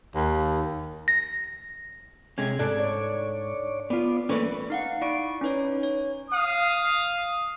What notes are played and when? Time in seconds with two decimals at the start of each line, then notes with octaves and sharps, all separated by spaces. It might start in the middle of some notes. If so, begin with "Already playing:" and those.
0.15 D#2
1.08 A#6
2.38 C3 G#3 C#4 G#6
2.59 G#2 D4 G#4 A4
2.80 C#5 D5
3.90 B3 F4 D5
4.29 E3 A3 A#3 C#4 B4 D5
4.70 D#4 F5 F#5
5.01 E4 D5 C#6 D7
5.41 C#4 D#4 B4 C#5
5.83 C#5
6.29 F5 D#6